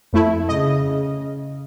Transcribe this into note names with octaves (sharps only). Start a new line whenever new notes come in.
F2 A3 E4
C#3 D#5